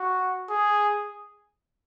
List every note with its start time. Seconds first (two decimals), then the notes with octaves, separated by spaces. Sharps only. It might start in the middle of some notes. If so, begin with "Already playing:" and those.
Already playing: F#4
0.50 G#4